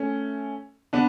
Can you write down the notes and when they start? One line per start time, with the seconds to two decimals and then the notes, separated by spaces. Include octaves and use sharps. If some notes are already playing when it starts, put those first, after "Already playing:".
Already playing: A3 C#4
0.93 B3 D4